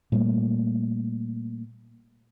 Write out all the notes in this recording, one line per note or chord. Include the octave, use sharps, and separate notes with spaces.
A#2 G3 A3 A#3